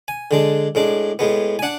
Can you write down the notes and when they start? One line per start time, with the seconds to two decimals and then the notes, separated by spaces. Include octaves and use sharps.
0.08 G#5
0.31 D3 G#3 D4
0.75 A2 G#3 D4
1.19 A2 G#3 B3
1.59 G#5
1.63 D4 F#5